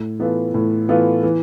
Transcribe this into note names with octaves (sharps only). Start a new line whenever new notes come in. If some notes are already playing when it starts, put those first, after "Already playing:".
Already playing: A2
E3 B3 F4 A4
A2
E3 B3 F4 A4
E3